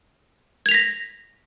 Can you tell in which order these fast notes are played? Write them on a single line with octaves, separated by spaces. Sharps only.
G#6 F7 B6 A#6